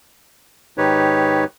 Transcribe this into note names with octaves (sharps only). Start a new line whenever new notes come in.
G#2 D#3 D#4 G4 B4 C#5